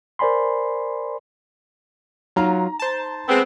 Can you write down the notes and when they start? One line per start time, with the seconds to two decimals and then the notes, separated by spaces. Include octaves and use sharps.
0.19 A#4 C5 D5 G#5 B5 C6
2.36 F#3 D#4 F4 A#5
2.79 C5 A5
3.29 G#3 B3 C4